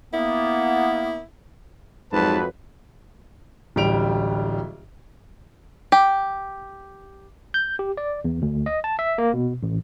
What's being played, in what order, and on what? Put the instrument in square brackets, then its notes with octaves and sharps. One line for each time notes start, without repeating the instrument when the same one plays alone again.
[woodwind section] A#3 B3 [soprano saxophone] E4
[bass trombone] F2 [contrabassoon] G#2 [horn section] F#3 B4 [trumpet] A5
[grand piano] D1 A1 G3 D7 F7
[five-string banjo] G4
[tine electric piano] G6
G4
D5
E2
D2
D#5
A5
E5
A#3
B2
A1